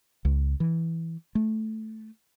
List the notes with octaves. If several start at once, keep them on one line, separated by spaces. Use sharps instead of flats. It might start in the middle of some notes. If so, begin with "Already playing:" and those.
C#2
E3
A3